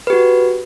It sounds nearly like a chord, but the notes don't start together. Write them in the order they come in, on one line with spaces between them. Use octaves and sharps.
B4 G4 F#4